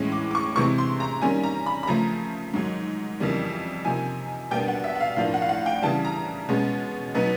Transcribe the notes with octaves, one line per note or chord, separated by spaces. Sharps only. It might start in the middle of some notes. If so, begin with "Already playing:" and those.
Already playing: A2 E3 G#3 C#4
D6
D6
C#6
C3 E3 G#3 C4 C#6
C6
A#5
D#3 G3 A#3 C#4 G#5
A#5
B5
B5
C#3 F3 A3 A#5
G#2 D#3 F#3
F2 C#3 E3 G3 A#3
C3 F3 A#3 D#4 G#5
B2 G3 A#3 D4 G5
F#5
E5
F#5
F5
A2 F3 A#3 D4 F5
F#5
F5
F#5
G5
C#3 E3 G3 A5
A#5
B2 G#3 C#4
B2 F#3 B3 D#4